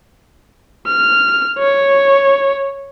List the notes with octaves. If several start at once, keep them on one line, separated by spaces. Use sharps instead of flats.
F6
C#5